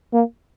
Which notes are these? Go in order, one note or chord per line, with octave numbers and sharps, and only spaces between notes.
A#3